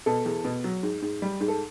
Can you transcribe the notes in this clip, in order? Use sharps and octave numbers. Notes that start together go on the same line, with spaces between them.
B2 A4
E2
B2
F#3
G#2
G#2
G3
G#2
A4